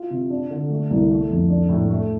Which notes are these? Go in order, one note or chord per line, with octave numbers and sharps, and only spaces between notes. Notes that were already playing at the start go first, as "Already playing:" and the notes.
Already playing: F4
C3
D4
D3
A3
C2
A3
F2
D4
A2
A3